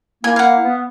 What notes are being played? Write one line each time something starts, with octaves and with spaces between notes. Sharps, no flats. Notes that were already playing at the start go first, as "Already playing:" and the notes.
A#3 E4 G#5
F5 F#5
B3